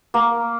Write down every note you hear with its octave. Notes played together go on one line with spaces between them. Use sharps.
A#3